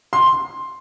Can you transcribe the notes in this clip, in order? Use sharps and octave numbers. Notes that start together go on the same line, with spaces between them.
C6